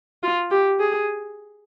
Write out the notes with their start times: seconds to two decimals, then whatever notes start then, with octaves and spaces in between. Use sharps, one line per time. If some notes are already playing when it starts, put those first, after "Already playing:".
0.23 F4
0.51 G4
0.80 G#4